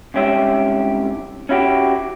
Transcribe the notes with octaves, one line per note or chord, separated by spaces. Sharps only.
C2 G#2 C#4 G4 E5
C#4 E4 F#4 G4